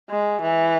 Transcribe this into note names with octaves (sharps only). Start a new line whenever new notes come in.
G#3
E3